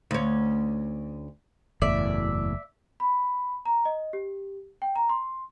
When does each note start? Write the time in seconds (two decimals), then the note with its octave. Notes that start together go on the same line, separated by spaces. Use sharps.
0.11 D2 C#4
1.82 F#1 E2 A2 D5 E5
3.00 B5
3.65 A#5
3.85 D#5
4.13 G4
4.82 G5
4.96 A#5
5.09 C6